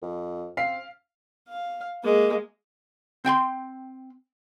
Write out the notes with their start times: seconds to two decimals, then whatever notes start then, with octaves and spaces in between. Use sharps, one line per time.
0.02 F2
0.57 C4 F5 B6 C7
1.48 F5
2.04 G#3 A#3
3.25 C4 G5 G#5 C6